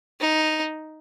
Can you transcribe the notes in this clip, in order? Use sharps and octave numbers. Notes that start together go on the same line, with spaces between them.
D#4